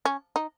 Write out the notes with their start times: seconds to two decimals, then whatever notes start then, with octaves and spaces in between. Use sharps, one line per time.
0.05 C#4
0.36 D#4